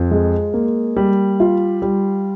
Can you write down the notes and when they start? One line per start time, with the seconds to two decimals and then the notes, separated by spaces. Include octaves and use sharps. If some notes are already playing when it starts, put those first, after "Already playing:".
Already playing: F2 F4
0.11 G#3
0.54 A#3
0.96 G3
1.40 F4
1.82 G3